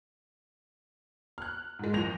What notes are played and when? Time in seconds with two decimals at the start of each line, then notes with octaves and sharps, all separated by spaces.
1.38 F6 F#6
1.79 G#2 G#3
1.93 F#1 E2 F3 G6 A#6 F7